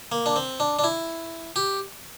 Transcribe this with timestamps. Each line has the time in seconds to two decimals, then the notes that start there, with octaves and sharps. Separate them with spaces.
0.12 A#3
0.26 D4
0.36 C4
0.60 D4
0.79 D4
0.84 E4
1.56 G4